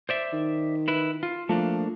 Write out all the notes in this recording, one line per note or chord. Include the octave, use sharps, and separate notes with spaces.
C5 D5 E5
D#3
E4 B4
F4
F3 A3 A#3 D4